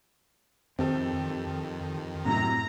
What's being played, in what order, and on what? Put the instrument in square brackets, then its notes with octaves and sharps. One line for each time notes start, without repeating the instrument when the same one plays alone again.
[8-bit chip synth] F2 D#3 [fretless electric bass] C4 [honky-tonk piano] G4 A4
[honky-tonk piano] F#2 C3 [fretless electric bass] A2 [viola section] A#5